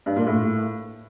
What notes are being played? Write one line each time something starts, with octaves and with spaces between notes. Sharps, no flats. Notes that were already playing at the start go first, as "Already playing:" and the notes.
G2
A#2
A2